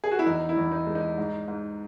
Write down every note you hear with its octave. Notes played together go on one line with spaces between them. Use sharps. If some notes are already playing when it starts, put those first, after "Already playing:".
G#4
F#4
E4
E2 D#4
E4
E2
D#4
G#3
D#4
G#2
G#2